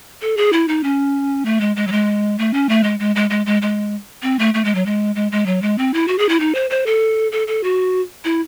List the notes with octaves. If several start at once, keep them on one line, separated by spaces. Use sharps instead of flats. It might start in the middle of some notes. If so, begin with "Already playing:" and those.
A4
G#4
E4
D#4
C#4
A3
G#3
G#3
F#3
G#3
A3
C#4
A3
G#3
G#3
G#3
G#3
G#3
G#3
C4
A3
A3
G#3
F#3
G#3
G#3
G#3
F#3
G#3
C4
E4
F#4
G#4
E4
D#4
C5
C5
A4
A4
A4
F#4
E4